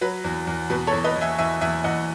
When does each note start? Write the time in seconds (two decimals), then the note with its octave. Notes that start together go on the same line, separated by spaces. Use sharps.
0.01 F#3 B4
0.24 E2
0.47 E2
0.70 B2 B4
0.87 A4 C#5
0.93 E2
1.04 B4 D#5
1.16 E2
1.21 E5 G#5
1.38 E2 E5 G#5
1.61 E2 E5 G#5
1.84 E2 D#5 F#5